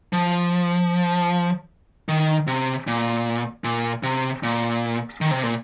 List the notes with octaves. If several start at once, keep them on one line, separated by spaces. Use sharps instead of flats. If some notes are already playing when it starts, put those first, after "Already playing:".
F3
D#3
C3
A#2
A#2
C3
A#2
D#3
C3
A#2